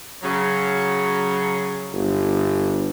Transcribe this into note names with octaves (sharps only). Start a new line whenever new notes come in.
C#3 F#3
G1